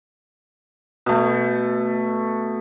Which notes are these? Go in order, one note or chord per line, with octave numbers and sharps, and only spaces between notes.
B2 A3